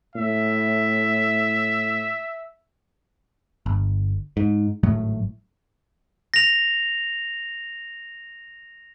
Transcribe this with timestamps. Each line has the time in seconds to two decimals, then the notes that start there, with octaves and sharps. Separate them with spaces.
0.16 A2 E5
3.66 G1
4.37 G#2
4.83 G#1 A2 F#3 A3
6.34 A#6 F7